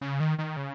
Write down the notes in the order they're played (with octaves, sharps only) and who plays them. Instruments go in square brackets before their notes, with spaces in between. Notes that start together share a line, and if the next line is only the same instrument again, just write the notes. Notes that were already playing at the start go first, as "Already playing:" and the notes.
[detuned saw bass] C#3
D#3
D#3
C#3